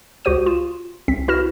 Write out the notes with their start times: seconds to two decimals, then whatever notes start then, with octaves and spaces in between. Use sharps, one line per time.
0.25 C#2 F#4 G4 C5 D#6 D#7
0.46 F4 E7
1.08 C2 C4 B6
1.28 E4 F#4 B4 F6 A#6 E7